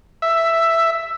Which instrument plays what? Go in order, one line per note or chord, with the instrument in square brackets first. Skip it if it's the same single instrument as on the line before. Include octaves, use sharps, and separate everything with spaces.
[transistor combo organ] E5